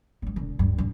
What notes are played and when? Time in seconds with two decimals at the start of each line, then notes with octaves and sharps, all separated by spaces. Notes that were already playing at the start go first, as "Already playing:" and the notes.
0.22 G#1 G#3
0.36 E1 D3
0.59 D2 G2
0.78 E1 G#2